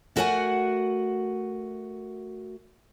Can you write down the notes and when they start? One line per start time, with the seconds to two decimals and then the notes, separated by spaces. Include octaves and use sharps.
0.16 A3 F#4 A#4 B4 F#5 G#5